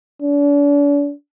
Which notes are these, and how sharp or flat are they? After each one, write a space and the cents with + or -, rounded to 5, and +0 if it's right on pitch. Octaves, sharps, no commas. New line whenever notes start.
D4 -40